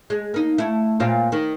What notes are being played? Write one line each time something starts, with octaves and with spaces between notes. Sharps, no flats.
G#3
A#3 D#4
A3 E4
A#2 C4 F4
D#3